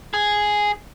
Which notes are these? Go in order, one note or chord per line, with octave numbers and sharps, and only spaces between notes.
G#4